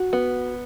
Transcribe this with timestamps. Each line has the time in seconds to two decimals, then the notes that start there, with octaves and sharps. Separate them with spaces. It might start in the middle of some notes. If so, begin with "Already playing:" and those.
Already playing: F#4
0.13 B3